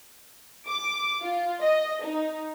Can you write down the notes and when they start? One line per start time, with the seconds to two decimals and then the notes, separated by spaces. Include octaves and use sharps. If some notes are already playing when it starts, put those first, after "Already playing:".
0.66 D6
1.22 F4
1.61 D#5
2.04 D#4